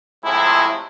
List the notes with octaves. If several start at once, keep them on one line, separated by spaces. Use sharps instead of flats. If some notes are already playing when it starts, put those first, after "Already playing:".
A2 C3 F3 G#3 E4